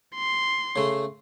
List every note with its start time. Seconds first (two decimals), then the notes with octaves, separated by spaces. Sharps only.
0.15 C6
0.76 C#3 A3